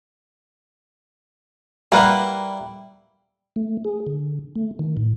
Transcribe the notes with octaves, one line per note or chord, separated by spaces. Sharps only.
G3 A#3 E4 B4 F#5
A3
G#4
D3
A3
D#3
A2